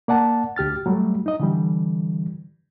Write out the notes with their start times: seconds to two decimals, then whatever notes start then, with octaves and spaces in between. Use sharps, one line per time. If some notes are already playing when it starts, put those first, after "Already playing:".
0.08 A#3 D5 F#5 A5
0.56 D2 G4 F6 A6
0.86 F#3 G3 A3
1.26 D#4 D#5
1.40 D3 E3 G3